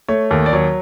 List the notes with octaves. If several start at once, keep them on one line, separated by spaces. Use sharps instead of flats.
A3 C#5
D#2
D5
F#3 C#5